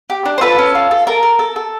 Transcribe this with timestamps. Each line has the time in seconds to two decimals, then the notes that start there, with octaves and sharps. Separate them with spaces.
0.10 G4
0.26 D4
0.38 C5
0.41 F4 A4 B4
0.59 C#4
0.75 F4
0.91 A4
1.07 A4 A#4
1.23 A4
1.39 A4
1.56 A4